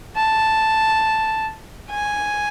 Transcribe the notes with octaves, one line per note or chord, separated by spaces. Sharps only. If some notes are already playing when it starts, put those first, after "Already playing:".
A5
G#5